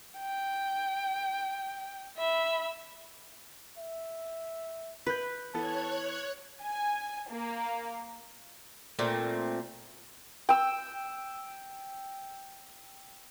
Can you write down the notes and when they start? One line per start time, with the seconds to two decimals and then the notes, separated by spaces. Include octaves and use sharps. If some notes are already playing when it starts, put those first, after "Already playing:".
0.20 G5
2.18 E5 B5
3.78 E5
5.07 B4 B5 G6
5.54 E3 B3 A4 C#5 A5 F#6 G#6
6.61 G#5
7.29 A#3
8.99 A#2 A3 C4
10.49 G5 E6